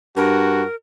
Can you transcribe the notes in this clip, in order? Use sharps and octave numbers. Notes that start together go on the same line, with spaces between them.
G2 F#4 A#4